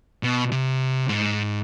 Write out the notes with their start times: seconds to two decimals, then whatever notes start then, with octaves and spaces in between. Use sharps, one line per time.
0.23 B2
0.52 C3
1.09 G#2